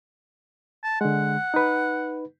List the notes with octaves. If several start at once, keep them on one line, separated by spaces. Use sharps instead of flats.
A5
D3 G#3 F#5
D#4 B4